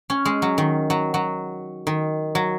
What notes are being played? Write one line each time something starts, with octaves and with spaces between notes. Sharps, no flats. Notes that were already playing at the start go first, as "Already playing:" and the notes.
C#4
G#3
F#3
D#3
F#3
F#3
D#3
F#3